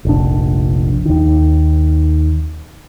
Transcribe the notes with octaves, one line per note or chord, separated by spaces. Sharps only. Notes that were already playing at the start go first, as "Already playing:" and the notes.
F1 A#1 D4
D#2 D#3